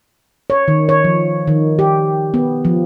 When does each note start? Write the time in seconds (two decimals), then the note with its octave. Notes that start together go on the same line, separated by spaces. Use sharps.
0.50 C#5
0.68 D#3
0.89 C#5
1.04 F3
1.47 D#3
1.79 G4
2.34 B3
2.65 F3